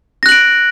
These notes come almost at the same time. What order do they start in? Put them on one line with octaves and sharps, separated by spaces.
A#6 F#6 F#7 D7